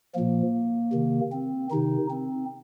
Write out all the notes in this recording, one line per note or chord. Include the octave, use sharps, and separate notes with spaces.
A#2 F3 A#3
C3 D#3
C4
C3 D#3 D#4
C4